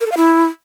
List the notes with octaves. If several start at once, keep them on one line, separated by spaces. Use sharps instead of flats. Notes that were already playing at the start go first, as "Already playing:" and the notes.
A#4
A4
F5
E4